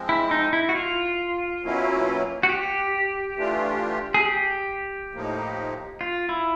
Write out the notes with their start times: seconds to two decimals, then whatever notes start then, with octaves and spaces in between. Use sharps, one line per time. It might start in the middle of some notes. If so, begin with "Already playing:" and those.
Already playing: F3 G#3 C4
0.09 E4
0.31 D#4
0.53 E4
0.69 F#4
0.75 F4
1.63 B2 F#3 A#3 C#4 E4
2.43 F#4
2.49 G4
3.37 E3 A3 D4 F4
4.14 G#4
4.26 G4
5.13 A2 F3 A#3 D#4
6.01 F4
6.29 E4